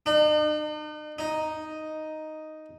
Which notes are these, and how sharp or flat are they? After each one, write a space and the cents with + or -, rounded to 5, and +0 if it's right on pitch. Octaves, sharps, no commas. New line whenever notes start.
D#4 -45
D#4 +0